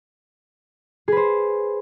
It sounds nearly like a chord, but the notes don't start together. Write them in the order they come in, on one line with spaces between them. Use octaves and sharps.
G#4 B4 C5